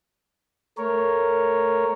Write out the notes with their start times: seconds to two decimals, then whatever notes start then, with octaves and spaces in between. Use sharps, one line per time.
0.78 A3 A#4 C#5